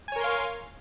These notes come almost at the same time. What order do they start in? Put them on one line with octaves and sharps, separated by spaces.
G#5 C#5 A#4 C6 F5